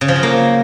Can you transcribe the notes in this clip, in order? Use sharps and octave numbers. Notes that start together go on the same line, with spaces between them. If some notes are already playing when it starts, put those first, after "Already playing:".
C#3
F3
F#3
A#3